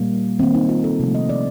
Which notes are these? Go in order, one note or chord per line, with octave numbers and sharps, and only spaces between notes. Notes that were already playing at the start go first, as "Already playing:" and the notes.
Already playing: A#2 G3 A#3
D#3 A#3 C4
D#4
F4
A4
C3 F3 A3
D#5
D5